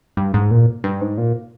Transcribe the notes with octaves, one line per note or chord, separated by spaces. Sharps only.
G2
G#2
A#2
G2
G#2
A#2